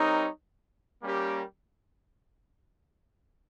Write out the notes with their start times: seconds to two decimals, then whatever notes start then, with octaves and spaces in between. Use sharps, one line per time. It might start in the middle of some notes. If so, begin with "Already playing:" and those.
Already playing: G3 C4 D#4 A#4 C#5
1.03 G3 A#3 C#4 G4 A#4